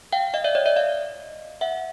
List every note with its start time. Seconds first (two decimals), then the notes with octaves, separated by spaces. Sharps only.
0.12 F5 G5
0.34 D#5 F5
0.44 D5 E5
0.55 C#5 D#5
0.66 D5 E5
0.76 D#5 F5
1.61 E5 F#5